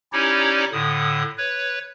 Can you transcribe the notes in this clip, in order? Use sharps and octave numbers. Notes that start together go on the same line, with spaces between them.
C#4 D#4 E4 G4 C#5 D5
A2 D3 D#6
B4 C#5